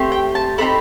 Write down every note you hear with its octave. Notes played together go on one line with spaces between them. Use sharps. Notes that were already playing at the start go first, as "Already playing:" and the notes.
Already playing: A3 C4 G4
G5
A5
A3 C4 D#4 G4 B5